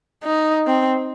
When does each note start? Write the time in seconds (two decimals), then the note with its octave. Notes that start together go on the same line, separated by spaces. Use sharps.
0.24 D#4
0.66 C4